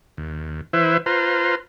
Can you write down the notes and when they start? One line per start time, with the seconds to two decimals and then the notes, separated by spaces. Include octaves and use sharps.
0.17 D#2
0.73 E3 E4 B4 C5 E5
1.06 F4 B4 C5 A#5 C6